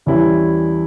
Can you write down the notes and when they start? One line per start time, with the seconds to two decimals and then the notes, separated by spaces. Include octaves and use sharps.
0.06 E2 E3 G3 C#4 E4